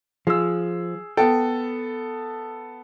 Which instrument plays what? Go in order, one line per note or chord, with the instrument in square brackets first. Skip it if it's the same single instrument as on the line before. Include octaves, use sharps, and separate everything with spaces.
[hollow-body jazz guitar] F3 [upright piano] G#4 E6
[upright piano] B3 A4 [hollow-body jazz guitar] G5